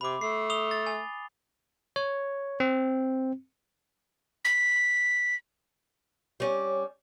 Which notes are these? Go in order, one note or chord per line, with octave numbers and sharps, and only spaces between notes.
C3 B5 D6
A3 C7
D#6 F7 G7
A6
G#5
C#5
C4
B6
G3 C#4